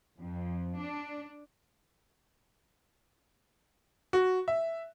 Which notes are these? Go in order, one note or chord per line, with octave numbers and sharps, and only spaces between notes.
F2
D4
F#4
E5